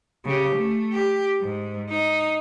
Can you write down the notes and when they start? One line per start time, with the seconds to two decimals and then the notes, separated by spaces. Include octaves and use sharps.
0.25 C#3 G4
0.56 A3
0.92 G4
1.41 G#2
1.89 D#4